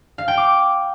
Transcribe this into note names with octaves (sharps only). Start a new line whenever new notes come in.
F5
G5
D6